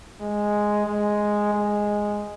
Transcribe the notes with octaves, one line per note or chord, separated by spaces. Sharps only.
G#3
G#3
G#3